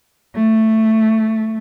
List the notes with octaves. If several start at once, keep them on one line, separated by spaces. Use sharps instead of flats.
A3